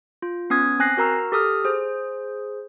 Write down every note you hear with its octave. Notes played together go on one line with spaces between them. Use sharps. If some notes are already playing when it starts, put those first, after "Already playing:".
F4
B3 C#4 D#6 G#6
C4 G#5 F#6 A#6 C7
F#4 A#4 A#5 E6
G4 A4 D#6 F6
G#4 C5